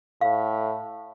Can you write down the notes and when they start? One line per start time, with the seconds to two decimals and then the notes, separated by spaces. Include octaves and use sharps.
0.21 A2 F5